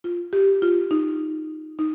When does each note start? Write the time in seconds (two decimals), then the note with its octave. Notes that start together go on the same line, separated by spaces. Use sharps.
0.04 F4
0.33 G4
0.62 F4
0.91 D#4
1.79 D#4